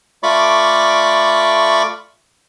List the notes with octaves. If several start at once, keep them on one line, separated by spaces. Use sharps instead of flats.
A3 F4 D5 B5 C#6 D6